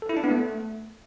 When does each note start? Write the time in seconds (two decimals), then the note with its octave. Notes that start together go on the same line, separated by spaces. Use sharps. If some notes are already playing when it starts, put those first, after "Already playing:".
0.02 A4
0.09 E4
0.17 D4
0.24 B3
0.31 A3